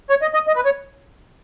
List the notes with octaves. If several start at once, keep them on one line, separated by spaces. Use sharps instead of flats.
C#5
D#5
D#5
D#5
B4
C#5